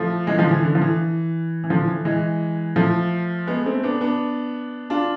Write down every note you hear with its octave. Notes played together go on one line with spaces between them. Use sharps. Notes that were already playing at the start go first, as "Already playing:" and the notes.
Already playing: F3 A3
E3 G#3
D3 F3
E3
D3
F3
E3
E3
D3 F3
E3
E3 G#3
F3 A3
G#3 B3
A3 C4
B3 D4
B3 D4
D4 F4